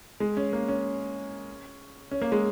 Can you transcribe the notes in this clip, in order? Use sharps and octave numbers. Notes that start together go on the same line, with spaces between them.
G#3
C#4
A#3
C#4
C#4
A#3
G#3